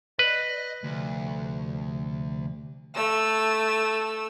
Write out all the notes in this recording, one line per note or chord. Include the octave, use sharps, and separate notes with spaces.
B4 D5 D#5
D2 C3 F3
A3 E6